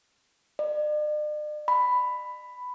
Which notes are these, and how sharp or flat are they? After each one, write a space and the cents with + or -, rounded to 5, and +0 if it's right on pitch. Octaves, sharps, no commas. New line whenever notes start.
D5 +45
B5 +10